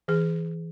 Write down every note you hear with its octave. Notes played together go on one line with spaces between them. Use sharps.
E3 G#4